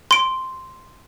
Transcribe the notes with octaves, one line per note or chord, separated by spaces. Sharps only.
C6 D7